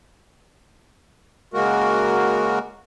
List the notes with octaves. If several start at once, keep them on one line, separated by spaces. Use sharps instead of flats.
C#3 G#3 A#3 F#4 A#4